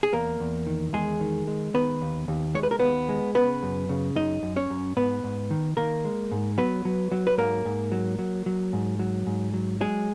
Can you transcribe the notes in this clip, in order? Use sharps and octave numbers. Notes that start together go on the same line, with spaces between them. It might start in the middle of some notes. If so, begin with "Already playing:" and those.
G#4
E2 A#3 A#4
E2
D#3
E2 G#3 G#4
D#3
G#3
D#3 B3 B4
D#2
D#2
G#3 C#5
B4
A#4
D#2 B3 B4
G#3
C#3 B3 B4
F#2
C#3
F#2 D#4 D#5
F#2
C#4 C#5
F#2
G#2 B3 B4
G#2
D#3
D#3 A#3 A#4
G#3
G#2
F#3 B3 B4
F#3
F#3
B4
G#2 A#3 A#4
G#2
F#3
F#3
F#3
G#2
F#3
G#2
F#3
F#3 G#3 G#4